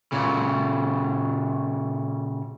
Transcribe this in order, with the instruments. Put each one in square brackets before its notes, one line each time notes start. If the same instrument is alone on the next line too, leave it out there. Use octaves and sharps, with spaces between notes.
[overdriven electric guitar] A#2 C#3